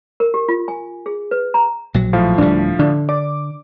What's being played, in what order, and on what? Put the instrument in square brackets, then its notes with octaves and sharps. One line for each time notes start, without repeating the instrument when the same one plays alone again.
[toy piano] A#4
G4
F4
G#5
G#4
B4
A#5
[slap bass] A#1 F#3
[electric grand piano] A2 F3 F5
[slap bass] D1 D2 G3 [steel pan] D4
[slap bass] D3 [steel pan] D4
[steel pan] D5 [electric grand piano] D6